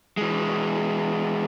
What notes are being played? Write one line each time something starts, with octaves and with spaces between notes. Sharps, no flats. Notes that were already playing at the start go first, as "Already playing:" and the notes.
E3 G#3